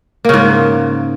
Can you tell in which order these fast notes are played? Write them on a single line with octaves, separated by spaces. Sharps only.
A#3 C#3 G#2